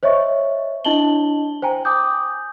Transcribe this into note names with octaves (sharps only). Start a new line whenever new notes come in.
C5 C#5 D#5 E5 C#6
D4 E4 D#5 A5 F#7 G7
C5 G5 G#5 A#5
G5 G#5 D6 D#6 G6